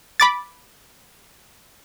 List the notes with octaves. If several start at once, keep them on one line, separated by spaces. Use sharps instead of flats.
B5 D6 A6